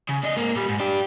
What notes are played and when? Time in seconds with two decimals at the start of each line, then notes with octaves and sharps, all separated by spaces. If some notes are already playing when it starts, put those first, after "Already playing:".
0.09 C#3
0.24 D4 D#5
0.36 G#2 A#3
0.55 A#2 G3
0.68 G#2
0.80 D4 G4